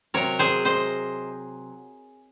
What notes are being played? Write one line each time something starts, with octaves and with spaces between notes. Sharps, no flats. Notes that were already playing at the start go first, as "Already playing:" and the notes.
C3 F#3 A#4 C#5
G#4 C5
C5 D#5